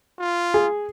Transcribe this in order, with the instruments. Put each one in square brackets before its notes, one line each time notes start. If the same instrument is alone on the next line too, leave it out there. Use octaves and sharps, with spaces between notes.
[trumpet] F4
[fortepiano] G#4